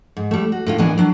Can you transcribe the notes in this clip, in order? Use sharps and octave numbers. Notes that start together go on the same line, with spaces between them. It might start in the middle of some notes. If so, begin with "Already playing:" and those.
G#2
G3 A3
F#4
A2 D3 F4
D#2 A2 E3 B3 D4 G#5
F#3 D4